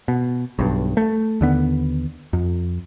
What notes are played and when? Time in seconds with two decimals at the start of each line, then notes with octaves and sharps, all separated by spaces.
0.08 B2
0.59 B1 G2
0.97 A3
1.41 D#2 D3 B3
2.33 F2